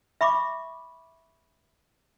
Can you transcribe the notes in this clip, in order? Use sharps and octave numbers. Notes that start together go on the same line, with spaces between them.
E5 B5 C#6 D6